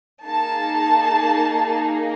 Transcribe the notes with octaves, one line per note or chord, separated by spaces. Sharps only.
A#3 D#4 G#4 A5